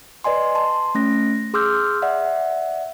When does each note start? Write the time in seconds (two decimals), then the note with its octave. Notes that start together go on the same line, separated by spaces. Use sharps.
0.24 B4 D5 D#5 G#5 C6
0.55 A5 C6
0.95 A3 C#4 A#6
1.54 G#4 C6 D6 E6 F6 G6
2.02 D5 E5 F#5